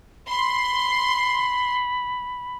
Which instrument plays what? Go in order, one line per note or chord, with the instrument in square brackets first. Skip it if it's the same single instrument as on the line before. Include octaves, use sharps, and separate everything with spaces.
[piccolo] B5 [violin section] C6